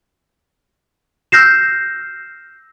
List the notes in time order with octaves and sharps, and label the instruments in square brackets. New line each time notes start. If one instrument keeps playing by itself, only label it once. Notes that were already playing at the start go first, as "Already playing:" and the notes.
[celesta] E6 F6 G6 A#6 C7 E7